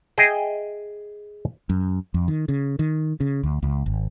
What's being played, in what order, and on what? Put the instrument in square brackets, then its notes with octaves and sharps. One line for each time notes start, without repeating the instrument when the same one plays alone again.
[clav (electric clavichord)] G#4 D#5 E5 G5
[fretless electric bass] F#2
F2
D#3
C#3
D#3
C#3
D2
C#2
G#1